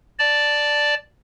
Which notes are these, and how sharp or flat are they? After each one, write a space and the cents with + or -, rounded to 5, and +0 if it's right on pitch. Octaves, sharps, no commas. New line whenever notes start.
D5 +0 A5 +0